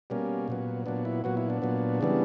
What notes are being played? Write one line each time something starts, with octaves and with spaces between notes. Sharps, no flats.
B2 G3 A#3 C#4
A#2 F#3 B3
A#2 F#3 B3 D4
E4
A#2 F#3 B3 F#4
E4
D4
A#2 F#3 B3
C#3 E3 G3 B3